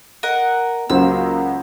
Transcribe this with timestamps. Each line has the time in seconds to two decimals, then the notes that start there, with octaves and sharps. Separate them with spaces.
0.23 A#4 D#5 F#5
0.89 C#2 F#3 A#3 C5 E6